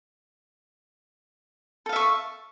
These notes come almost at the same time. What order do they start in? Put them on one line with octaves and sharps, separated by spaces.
A4 F5 E5 C#6